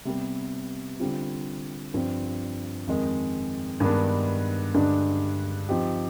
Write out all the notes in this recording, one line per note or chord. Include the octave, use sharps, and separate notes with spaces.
C3 G3 B3
D3 G3 C4 F4
G2 F3 C4
F2 D#3 G#3
G2 D#3 G#3 B3 D4
G2 D3 G#3 D4
F3 C4 D#4 G4